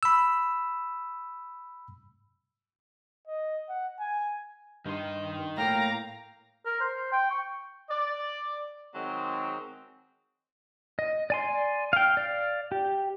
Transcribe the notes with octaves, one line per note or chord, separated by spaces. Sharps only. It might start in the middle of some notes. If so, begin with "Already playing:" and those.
B5 E6
D#5
F#5
G#5
G2 D#3 D#4 C6
A2 A#3 F5 G5 A#5
A#4
C5
G5
C#6
D5
D#3 F#3 G#3 C4
D#5
D5 G#5 C6
F5 G5
D5 F5
G4